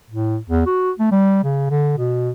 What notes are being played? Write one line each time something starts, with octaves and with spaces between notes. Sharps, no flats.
A2
E2
F#4
A3
G3
C#3
D3
B2